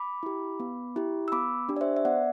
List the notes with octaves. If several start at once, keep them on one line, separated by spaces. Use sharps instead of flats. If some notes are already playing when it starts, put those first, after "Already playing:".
Already playing: B5 D6
E4 G4
B3
E4 G4
E6
B3 B5 D6
D4 G4
D5
C5 E5
E5
B3 D5 F#5